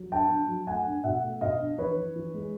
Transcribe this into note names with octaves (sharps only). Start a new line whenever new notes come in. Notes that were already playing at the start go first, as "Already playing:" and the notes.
Already playing: F#3
D4 G5 A5
D4
F#3
A3 F#5 G#5
D4
B2 E5 F#5
A3
B2 D#5 F5
D4
E3 B4 C#5
E3
E3
G#3